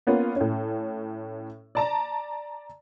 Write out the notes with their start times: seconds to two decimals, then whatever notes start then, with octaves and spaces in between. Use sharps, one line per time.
0.07 A#3 B3 C#4 F4
0.36 A2 C#4
1.75 D5 A5 A#5